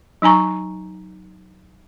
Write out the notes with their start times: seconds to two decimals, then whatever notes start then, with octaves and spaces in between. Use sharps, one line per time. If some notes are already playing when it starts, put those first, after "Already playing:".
0.22 F#3 D#4 G#5 A#5 C#6